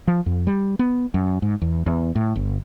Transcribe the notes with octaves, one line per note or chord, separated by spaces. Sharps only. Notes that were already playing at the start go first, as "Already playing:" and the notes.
F3
F2
G3
B3
F#2
G#2
E2
E2
A2
G1